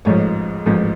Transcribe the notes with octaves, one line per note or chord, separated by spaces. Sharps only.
A1 G#2 F3 C#5
A1 G#2 F3